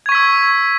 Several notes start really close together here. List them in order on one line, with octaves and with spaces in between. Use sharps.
G#6 C#6 B6 E6